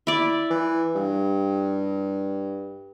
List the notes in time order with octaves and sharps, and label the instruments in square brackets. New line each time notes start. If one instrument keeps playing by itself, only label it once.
[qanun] E4 D5
[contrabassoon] E3
G2